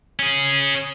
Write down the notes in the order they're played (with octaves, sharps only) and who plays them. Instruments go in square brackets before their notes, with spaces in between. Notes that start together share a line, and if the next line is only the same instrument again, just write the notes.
[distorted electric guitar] C#4 G#4